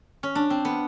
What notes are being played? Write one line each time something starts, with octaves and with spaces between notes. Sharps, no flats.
C#4
D4
C4
B3